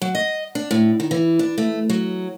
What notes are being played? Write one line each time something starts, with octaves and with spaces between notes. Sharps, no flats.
F#3
D#5
D4
A2
D#3
E3
D4
A3
F#3